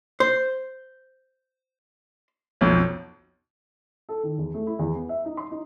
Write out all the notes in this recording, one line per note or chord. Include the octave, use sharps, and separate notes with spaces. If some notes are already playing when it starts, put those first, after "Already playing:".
C5
B1 F2
A4
D#3
E2
A3
E4
E2
B3
E5
D#4
C6
D#4